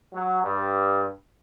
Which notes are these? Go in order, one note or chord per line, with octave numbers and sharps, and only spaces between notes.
F#3
G2